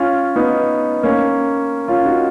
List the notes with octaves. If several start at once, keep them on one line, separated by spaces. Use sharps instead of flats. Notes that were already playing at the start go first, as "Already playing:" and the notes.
Already playing: C#4 F4
B3 D#4
A#3 C#4
C#4 F4
D#4 F#4